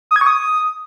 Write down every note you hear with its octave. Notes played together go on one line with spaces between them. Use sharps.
D#6
G#6
C#6
D#6